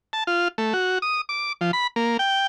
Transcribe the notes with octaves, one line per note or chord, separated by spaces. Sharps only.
A5
F4
A3
F#4
D#6
D6
F3
B5
A#3
G5